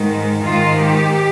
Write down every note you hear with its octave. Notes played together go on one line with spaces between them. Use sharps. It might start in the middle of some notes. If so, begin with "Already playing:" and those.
Already playing: G#2 D#3
G#2 D#3 F4
G4